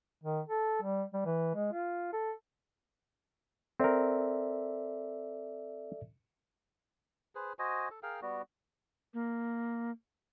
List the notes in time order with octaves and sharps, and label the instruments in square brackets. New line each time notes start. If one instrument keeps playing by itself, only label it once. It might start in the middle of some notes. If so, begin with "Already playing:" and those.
[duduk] D#3
A4
G3
G3
E3
G#3
F4
A4
[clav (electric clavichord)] C4 A#4 [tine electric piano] A4 D5 E5
[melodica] G#4 B4 C5
F#4 C5 D#5 G#5
A4
G#4 A#4 F5 G5
G3 B3 F#4
[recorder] A#3